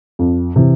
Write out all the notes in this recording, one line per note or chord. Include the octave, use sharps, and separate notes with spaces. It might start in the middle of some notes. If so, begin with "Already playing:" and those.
F2
C3 E3